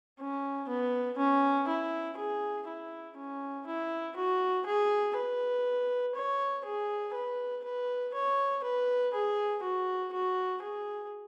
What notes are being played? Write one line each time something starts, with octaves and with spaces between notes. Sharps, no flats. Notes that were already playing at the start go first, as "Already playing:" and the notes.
C#4
B3
C#4
E4
G#4
E4
C#4
E4
F#4
G#4
B4
C#5
G#4
B4
B4
C#5
B4
G#4
F#4
F#4
G#4